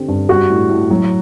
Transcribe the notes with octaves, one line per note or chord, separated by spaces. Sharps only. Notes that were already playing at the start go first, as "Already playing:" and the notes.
Already playing: D3 C4 G4
G2
G3 F#4
A2
A2
F#3